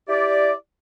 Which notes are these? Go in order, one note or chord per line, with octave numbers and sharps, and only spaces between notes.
E4 G4 D5